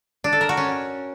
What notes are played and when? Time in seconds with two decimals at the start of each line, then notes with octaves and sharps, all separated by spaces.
0.24 D4
0.33 A4
0.41 A#4
0.49 F#4
0.57 C#4